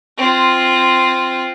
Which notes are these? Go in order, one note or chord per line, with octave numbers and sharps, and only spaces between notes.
C4 F4